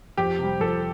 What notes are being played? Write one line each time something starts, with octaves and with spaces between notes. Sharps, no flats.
F2 G4
C3 G3
F2 A4